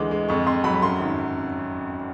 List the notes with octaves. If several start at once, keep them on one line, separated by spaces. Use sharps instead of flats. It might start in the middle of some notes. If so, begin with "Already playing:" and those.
Already playing: D2 E3 G#3 D6
G#3
F2 C#6
F2 C6
F#3 B5
B5
F#2 C6
G#1